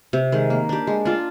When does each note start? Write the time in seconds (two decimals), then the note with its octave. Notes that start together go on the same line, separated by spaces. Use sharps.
0.13 C3
0.32 D#3 G#3
0.50 A#3
0.69 D4 G4
0.87 G#3
1.05 D4 F4